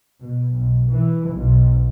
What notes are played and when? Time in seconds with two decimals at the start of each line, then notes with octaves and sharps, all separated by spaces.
0.21 B2
0.52 B1
0.89 E3
1.31 B1